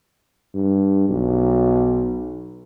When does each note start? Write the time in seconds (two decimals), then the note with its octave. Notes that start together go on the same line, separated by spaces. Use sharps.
0.54 G2
1.09 B1